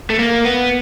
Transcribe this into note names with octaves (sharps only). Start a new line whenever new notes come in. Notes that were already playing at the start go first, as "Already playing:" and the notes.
A3
A#3
B3